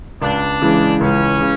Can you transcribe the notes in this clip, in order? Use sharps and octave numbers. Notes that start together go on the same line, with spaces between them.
C#2 D4
C#3 E3 G#3
C#2 C#4
C#3